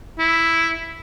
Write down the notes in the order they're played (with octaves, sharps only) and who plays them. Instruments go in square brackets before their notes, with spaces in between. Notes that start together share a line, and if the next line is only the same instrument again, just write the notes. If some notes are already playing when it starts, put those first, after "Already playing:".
[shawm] E4